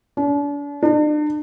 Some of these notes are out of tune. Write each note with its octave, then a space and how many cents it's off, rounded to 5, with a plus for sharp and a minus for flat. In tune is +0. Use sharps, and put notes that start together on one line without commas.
D4 -40
D4 +40